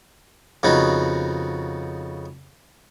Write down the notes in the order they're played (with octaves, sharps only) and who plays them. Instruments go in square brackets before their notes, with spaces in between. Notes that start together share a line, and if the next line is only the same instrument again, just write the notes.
[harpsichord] F2 C#3 B3 D#4 F#4